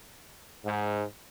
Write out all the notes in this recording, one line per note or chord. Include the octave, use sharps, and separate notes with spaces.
G#2